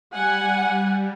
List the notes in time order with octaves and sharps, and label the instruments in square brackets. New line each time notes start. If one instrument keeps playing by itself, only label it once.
[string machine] G3 [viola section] F#5 G#5